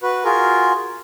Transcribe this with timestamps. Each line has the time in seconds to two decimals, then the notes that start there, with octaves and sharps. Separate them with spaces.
0.02 F#4 B4
0.24 F4 F#4 G#4 A#4